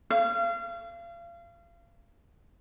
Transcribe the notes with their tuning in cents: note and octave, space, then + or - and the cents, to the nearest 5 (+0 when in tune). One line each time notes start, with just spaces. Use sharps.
F5 -35